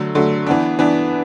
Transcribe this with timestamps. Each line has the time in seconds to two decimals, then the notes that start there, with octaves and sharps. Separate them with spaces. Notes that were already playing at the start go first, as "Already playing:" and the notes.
Already playing: D3 F#3 A3
0.15 D3 F#3 A3
0.47 E3 B3 D4
0.79 E3 B3 D4